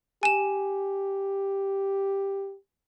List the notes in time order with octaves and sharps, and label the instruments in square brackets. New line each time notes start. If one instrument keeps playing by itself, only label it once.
[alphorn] G4 [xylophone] G#5 E7